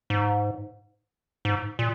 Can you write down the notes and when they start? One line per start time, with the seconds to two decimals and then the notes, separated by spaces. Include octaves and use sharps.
0.10 G#2
1.45 G#2
1.79 A#2